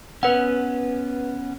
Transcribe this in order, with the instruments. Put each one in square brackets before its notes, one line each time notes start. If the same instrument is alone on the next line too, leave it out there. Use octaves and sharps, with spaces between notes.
[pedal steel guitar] B3 C#4 [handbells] B4 F#5